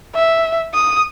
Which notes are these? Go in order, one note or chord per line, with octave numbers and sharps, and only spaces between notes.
E5
D#6